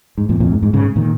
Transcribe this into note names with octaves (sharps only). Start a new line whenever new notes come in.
G#2
F2 A#2
F2 A#2
G#2
G#2
G#2 C#3
A#2 D#3